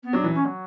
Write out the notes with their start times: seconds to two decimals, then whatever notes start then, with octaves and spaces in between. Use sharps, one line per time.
0.03 B3
0.13 F#3 D4
0.24 E3
0.34 C#4
0.45 F#3